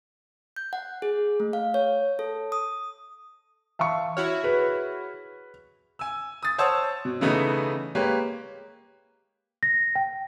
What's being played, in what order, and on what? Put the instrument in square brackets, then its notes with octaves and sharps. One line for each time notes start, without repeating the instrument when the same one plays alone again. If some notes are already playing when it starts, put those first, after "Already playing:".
[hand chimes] G6
F#5
G#4
A3
F5
C#5
A4
D#6
[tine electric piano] E3 F5 A5 [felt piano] E5 C#6
[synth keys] E4 F#4 C#5 [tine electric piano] F6
[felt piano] G#4 B4
[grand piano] G#5 E6
D#6 A6
C5 C#5 F#5 A5 D#6 E6
B2
C#3 E3 A3 B3 D#4
G#3 A#3 G4 B4 C#5
[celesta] A#6
G5